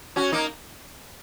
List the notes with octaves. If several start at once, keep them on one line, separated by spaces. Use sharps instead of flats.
C#4 F#4
A#3 D#4